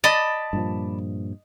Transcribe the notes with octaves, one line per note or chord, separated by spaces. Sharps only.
D5 D#5 A5 B5
G2 A#2 F3